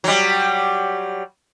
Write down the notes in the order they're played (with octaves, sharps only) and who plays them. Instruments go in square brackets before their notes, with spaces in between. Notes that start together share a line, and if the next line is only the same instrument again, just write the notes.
[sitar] F#3 G3